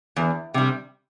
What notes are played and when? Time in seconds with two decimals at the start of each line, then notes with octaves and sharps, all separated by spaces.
0.16 E2
0.54 C3 G3